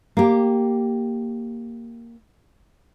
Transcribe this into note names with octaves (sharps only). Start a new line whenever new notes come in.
A#3 G4